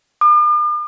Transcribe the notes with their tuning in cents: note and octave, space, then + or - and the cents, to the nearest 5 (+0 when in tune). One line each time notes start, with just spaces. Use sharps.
D6 +45